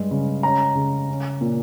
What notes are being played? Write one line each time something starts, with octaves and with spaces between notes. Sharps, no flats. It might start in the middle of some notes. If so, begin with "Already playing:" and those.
Already playing: G2 G#3
C#3
C#4 A#5
C#3
C#4
A#2